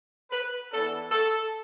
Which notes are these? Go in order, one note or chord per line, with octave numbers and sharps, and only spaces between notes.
B4
E3 B3 D4 A4
A4